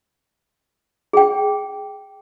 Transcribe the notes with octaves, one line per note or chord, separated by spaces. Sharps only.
G#4 G5